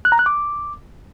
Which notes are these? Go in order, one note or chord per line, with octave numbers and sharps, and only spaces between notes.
F#6
A#5
F#6
D6